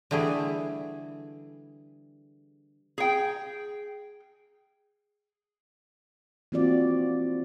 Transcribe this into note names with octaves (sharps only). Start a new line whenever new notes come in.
D3 E3 G3 A3 G#4
G#4 G5
E3 A#3 C4 F4 F#4 D5